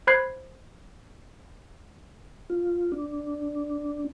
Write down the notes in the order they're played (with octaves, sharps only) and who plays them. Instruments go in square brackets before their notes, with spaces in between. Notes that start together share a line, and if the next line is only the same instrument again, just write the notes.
[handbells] C5 B5 F#6 G#6 C7
[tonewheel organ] F4
D4